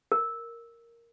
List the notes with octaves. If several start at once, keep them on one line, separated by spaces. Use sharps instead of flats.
A#4